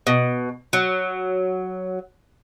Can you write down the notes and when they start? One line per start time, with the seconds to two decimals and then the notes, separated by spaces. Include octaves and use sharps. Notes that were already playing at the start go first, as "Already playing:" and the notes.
0.07 B2
0.73 F#3